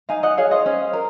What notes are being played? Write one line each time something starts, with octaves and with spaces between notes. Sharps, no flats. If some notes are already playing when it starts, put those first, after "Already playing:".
D#4 F5 G#5
D#5 F#5
G#4 C#5 F5
C5 D#5
C#4
A#4